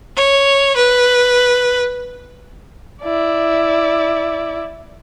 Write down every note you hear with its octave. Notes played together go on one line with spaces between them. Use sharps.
C#5
B4
E4 D5